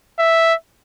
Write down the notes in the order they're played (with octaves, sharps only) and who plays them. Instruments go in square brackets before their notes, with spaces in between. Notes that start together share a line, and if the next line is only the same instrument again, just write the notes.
[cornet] E5